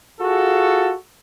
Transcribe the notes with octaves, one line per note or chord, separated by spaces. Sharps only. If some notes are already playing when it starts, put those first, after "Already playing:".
F4 F#4 G#4 A4